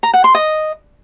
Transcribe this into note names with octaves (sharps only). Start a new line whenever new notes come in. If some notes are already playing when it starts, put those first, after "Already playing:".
A#5
F#5
C6
D#5